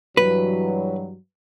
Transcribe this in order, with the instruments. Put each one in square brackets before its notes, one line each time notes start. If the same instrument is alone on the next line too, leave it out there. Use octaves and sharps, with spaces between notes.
[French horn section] G2 E3 F#3 [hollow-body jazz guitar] B4